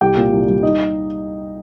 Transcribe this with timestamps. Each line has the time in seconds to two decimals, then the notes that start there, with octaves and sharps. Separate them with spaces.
0.01 C2 G4 G5
0.17 A#2
0.32 C2
0.48 G3
0.62 D#4 D#5